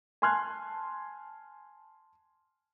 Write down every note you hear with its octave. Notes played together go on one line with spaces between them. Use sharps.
G#5 A5 C6 F6 F#6 G#6